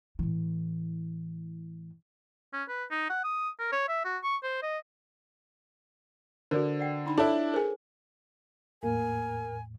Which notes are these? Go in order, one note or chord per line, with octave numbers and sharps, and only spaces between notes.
A2 E3
C#4
B4
D#4
F#5
D#6
A#4
C#5
E5
F#4
C#6
C5
D#5
D3 F#4 A#4 C5 D5
D5 F#5 G5
D4 D#4 B5
D4 E4 F4 A4 C#5 A5
G#4 A#4 C5 G#5
E2 A2 A#3 A#4 G#5